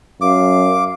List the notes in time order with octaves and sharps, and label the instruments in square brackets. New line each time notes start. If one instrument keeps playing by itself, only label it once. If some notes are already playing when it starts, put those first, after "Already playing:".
[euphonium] F#2 [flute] F5 [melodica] D6